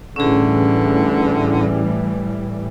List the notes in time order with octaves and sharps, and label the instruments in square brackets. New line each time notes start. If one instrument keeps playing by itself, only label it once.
[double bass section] A2 E3 G3 [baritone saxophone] D3 [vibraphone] C#4 G#4